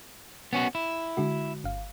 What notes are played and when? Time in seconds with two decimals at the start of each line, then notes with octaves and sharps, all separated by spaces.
0.53 B3 C#4 F#4
0.75 E4
1.17 D3 G#3 F#4
1.64 G1 F5